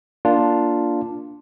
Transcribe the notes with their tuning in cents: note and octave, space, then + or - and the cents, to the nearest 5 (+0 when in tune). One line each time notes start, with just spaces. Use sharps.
A#3 +0 D4 +0 F4 +0